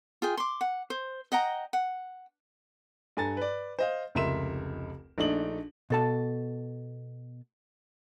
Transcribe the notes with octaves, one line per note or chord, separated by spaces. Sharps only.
F4 G#4 G5
C6 D6
F#5
C5
D#5 F#5 G5 A#5
F#5
G2 A4 G#5 A#5 A6
B4 D5
C5 D#5 F5
F1 C#2 A#4 E5 C6 E7
A#1 A3 D4 D#4 F#7
B2 A4 A5